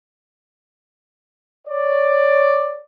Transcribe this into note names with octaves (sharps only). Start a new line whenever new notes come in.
C#5 D5